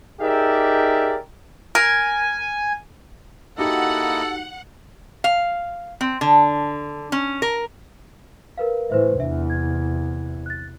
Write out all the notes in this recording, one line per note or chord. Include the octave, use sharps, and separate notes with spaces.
D#4 G4 G#4 A#4 D5 E5
A#4 G#5
A#3 D#4 E4 F#4 G4 A4 D#5 F#5
F5
C4
D3
C#4
A#4
A#4 B4 F5
A2 E3 B4 C5 E5
E2 C3 D4 E5
G#6
F#6 A6